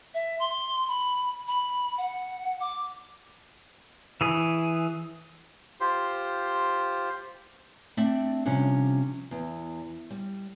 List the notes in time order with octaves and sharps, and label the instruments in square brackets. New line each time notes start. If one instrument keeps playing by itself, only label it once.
[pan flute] E5
C6
B5
B5
F#5
D6
[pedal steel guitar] E3 G#4
[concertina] F4 G4 C5 C6
[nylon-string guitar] A3 C4 D4 D5 E5
C3 F3 G3 C#4 D4
E2
G3